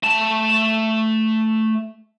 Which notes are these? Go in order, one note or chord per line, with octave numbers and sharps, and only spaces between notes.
A3 A5